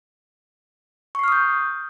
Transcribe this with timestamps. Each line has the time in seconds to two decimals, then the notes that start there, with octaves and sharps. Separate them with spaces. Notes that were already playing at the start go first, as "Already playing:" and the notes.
1.15 C#6
1.19 C7
1.24 F6
1.28 D#6
1.32 G6